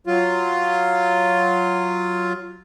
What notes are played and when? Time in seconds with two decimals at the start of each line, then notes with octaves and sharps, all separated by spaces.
0.07 F#3 F4